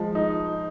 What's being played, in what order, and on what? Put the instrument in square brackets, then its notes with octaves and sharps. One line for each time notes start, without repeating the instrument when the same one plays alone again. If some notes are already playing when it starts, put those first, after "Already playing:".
Already playing: [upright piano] F3 [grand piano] G#3
[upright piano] D#4